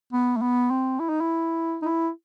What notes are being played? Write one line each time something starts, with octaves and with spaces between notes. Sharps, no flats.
B3
A3
B3
C4
E4
D#4
E4
D#4
E4